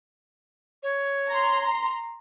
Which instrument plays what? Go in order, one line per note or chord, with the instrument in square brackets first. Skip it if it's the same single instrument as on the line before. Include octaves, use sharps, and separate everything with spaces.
[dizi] C#5
[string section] A#5 C6